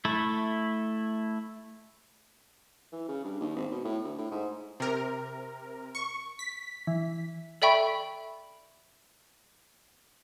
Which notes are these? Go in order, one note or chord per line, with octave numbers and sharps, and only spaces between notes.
A3 E4
E3
C#3
G2
D#2
G#1
B2
A2
D2
A2
G#2
C3 A#4
C#6
B6
E3
A4 D5 E5 G5 B5 C#6